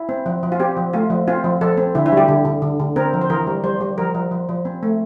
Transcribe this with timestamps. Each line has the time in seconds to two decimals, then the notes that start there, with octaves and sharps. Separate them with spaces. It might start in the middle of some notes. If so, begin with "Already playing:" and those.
Already playing: E4
0.09 C4
0.26 F3
0.43 F3
0.52 F4
0.60 C4 G4
0.77 F3
0.93 A3 F4
1.10 F3
1.28 C4 F4
1.44 F3
1.61 F3 A4
1.77 C4
1.95 D3 E4
2.06 E4
2.12 G3
2.17 G4
2.28 D3
2.45 D3
2.62 D3
2.80 D3
2.96 C4 A#4
3.13 F3
3.21 C5
3.30 E3 A#4
3.47 G3
3.64 G3 C5
3.81 G3
3.98 F3 A#4
4.15 F3
4.31 F3
4.49 F3
4.65 C4
4.83 A3